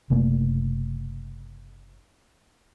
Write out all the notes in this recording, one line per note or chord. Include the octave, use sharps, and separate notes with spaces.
F#1 C3 A3 A#3